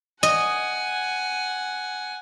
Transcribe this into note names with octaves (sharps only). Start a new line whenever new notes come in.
D#5 F#5 G#5